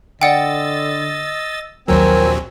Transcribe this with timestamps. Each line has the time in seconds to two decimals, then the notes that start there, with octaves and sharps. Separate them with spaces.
0.22 D3 D5 D#5 F#5 G5 E6 A6
1.88 A#1 D#2 F#3 C4 A#4 G#5 E6